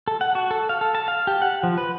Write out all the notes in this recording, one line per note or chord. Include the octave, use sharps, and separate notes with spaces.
A4
F#5
F#4
A4
F5
A4
A5
F5
G4
F#5
F3
B4